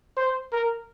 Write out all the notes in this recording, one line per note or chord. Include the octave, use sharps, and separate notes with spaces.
C5
A#4